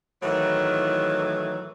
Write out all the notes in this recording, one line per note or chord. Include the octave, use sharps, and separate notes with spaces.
A2 D#3 E3 F#3